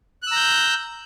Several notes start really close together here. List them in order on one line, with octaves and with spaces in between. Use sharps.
F#6 E6 A#5 G6